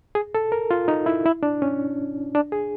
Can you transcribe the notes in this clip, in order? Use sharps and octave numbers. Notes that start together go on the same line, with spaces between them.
G#4
A4
A#4
F4
D#4
E4
E4
D4
C#4
D4
G#4